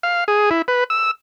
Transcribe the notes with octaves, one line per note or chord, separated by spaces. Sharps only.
F5
G#4
E4
B4
E6